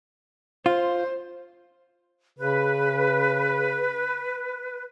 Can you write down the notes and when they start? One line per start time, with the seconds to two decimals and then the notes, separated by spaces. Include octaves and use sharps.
0.66 F4 C5
2.39 C#3 B4